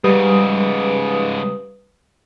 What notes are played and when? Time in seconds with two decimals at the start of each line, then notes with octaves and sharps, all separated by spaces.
0.04 G#2 C#3 G3 B4 D#6